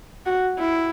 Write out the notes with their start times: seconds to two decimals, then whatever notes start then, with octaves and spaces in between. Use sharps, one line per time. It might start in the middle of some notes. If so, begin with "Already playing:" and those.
0.26 F#4
0.59 E4